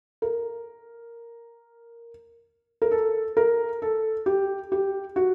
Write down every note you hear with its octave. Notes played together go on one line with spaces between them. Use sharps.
A#4
A#4
A4
A#4
A4
G4
G4
F#4